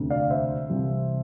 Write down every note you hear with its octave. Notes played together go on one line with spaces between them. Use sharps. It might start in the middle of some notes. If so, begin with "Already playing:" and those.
Already playing: E1 D2 C3
D5 F5
C5 E5
C2 C3 E3 G3